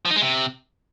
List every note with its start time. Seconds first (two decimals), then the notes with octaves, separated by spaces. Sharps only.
0.05 F3
0.11 D#4
0.16 G#3
0.21 C3